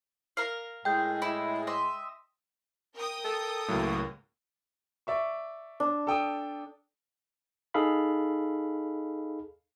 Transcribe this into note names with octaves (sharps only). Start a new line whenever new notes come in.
A#4 F5
A2 G#3 G5 G6
E4
D#5 E5 C6
A#4 G5 D#6
A4
C#2 A2 F#3 A#3
D5 E5 C#6
D4
A4 G5 D#6
D#4 G#4 A4 F5 B5